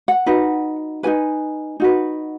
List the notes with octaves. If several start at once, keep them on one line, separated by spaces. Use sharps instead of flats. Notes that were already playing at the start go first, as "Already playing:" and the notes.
F#5
D#4 F#4 B4
D#4 F#4 B4 G#5
D#4 F#4 B4